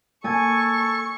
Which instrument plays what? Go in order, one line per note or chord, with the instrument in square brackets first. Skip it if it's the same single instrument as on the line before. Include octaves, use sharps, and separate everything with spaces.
[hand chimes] A#3 [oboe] A4 [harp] G#5 G#6 [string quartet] C#6